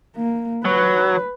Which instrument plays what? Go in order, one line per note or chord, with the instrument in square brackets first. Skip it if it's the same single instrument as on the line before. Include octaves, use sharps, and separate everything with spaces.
[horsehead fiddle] A#3
[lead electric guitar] F#3 [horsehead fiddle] B4